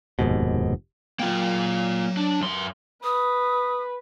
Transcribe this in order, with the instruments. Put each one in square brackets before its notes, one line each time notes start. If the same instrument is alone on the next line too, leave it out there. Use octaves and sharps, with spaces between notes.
[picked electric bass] F1 D#2 G#2 B2
[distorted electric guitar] F#3 G5 [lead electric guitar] A#3 F4
[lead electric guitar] D4
F#2 C6
[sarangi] B4 [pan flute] D#6